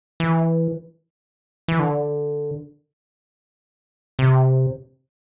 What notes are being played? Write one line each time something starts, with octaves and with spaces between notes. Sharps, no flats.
E3
E3
D3
C3